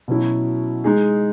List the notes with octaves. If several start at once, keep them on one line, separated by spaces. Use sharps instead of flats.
B2 F#3 C#4 E4
G#3 D#4 G#4